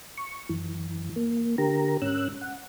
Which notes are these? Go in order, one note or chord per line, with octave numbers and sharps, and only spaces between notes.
C#6
F#2 E3
A#3
D3 G4 A#4 A#5
G#2 C#4 E6 F#6
F#5